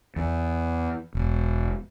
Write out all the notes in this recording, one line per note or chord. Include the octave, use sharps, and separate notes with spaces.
E2
E1